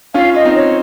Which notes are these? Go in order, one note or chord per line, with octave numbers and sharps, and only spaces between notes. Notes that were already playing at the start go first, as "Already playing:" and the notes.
C#4 F4 F5
F4 D#5
C4 D#4
C#5